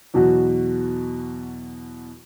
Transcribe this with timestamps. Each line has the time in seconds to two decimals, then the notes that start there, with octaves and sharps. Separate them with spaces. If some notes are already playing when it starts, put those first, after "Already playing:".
0.14 E2 B2 F#3 F#4